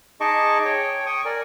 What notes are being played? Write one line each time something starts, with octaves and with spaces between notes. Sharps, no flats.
D#4 G#4 D#5 A5 C#6 D6
C#5 G5
G5 C#6 D#6
A#4 D5 G#5